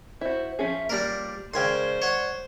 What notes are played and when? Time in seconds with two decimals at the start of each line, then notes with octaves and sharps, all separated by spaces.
0.21 E4 F#4 C5
0.59 F3 C#4 G#4 E5
0.90 G3 A#3 D4 A#4
1.54 C#3 G#3 A#4 C5 D5 G5 G#5 C6
2.02 C#5 F#5